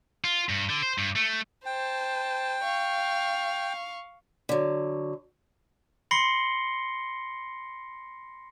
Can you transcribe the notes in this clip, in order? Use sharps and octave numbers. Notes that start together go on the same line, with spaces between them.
F4
G2
D3
C5
G2
A3
C5 G5 A5
F5 C#6
D3 F#3
B5 C6 A#6 C7 C#7 G7